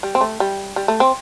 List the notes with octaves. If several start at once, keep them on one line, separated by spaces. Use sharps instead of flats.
G3
C4
A3
G3
G3
A3
C4